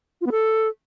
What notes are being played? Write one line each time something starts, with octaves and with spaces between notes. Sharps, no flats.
F4
B3
A4